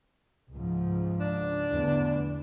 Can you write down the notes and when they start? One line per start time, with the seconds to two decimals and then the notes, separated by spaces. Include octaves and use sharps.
0.54 C#2 G#2 F3
1.20 D4
1.69 E2 D3 A3